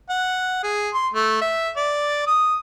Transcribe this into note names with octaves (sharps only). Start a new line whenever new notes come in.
F#5
G#4
C6
A3
E5
D5
D#6